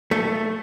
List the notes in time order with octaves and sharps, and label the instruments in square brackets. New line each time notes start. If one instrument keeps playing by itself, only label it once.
[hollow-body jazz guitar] A3